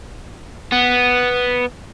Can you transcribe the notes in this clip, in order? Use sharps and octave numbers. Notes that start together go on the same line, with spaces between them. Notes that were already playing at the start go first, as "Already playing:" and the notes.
B3